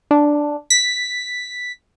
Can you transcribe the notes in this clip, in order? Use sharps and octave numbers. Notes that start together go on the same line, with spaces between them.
D4
B6